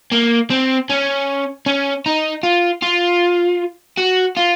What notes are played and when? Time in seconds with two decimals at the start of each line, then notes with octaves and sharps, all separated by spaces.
0.12 A#3
0.50 C4
0.90 C#4
1.66 C#4
2.06 D#4
2.43 F4
2.82 F4
3.98 F#4
4.37 F4